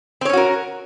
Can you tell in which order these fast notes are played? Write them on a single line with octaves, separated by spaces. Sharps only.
C4 C#5 C#4 F#4 A#4